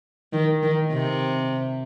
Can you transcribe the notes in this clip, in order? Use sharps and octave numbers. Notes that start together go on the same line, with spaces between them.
D#3
D#3
C3